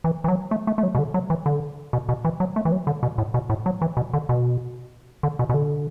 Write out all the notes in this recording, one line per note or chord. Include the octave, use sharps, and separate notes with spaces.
E3
E3
F#3
A3
A3
A3
F#3
B2
D3
F#3
E3
D3
B2
B2
E3
F#3
A3
E3
F#3
D3
B2
A2
B2
A2
F#3
E3
B2
D3
B2
D3
B2
B2
D3